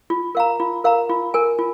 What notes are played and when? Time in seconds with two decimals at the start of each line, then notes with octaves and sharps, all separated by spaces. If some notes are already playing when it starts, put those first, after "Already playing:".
0.10 F4
0.35 A#4 F5 A#5
0.60 F4
0.84 A#4 F5 A#5
1.09 F4
1.34 A#4 G#5
1.59 F4